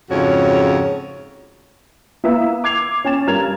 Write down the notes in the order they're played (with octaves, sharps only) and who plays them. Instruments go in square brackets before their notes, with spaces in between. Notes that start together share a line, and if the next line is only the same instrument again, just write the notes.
[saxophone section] F2 G#2 C#3 F#4 C#5
[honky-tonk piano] A#3 B3 E4 E5
D6 G#6 C7 F7
C#4 G#5 A6 E7
G2 A#4 G#6 F7